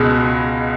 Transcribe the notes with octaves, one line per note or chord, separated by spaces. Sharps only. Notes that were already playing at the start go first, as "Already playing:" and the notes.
Already playing: C#2 B2 G#3